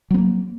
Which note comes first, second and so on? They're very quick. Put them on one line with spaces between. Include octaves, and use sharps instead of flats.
F#3 B3 A#3